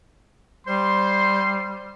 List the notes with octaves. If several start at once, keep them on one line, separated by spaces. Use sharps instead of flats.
G3 C5 C6